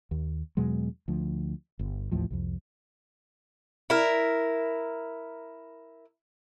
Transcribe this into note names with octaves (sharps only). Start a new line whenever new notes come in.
D#2
E2 B2 F#3 G#3
D2 F3
G1
A1 D#2 A2 F3
C2 F2
E4 A#4